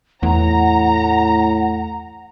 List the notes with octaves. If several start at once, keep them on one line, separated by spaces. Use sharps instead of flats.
E2 A2 F#5 A#5